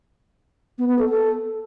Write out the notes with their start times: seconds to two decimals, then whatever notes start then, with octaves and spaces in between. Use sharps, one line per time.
0.78 B3
0.89 B3
0.99 A4
1.09 A4